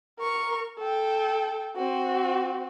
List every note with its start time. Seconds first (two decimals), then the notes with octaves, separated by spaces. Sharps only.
0.20 A#4 C#6
0.79 A4 G5
1.76 C4 F#4